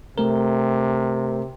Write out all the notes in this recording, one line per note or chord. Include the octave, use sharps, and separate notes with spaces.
C3 A3 A#4